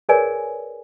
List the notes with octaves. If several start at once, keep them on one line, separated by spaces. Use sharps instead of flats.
G#4 A#4 B4 C#5 D5 G#5